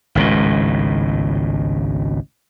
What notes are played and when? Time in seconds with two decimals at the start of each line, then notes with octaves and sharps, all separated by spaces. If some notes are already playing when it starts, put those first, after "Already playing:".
0.15 G#1 C#2 A2